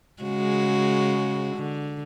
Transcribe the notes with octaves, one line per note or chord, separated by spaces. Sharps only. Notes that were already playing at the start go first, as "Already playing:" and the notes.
C#3 G#3 F#4
D3